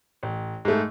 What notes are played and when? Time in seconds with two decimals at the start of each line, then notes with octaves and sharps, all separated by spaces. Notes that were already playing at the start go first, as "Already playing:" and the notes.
0.23 A1
0.65 G#2 A3